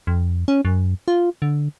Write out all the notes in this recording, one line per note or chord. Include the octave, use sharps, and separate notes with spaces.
F2
C#4
F#2
F4
D3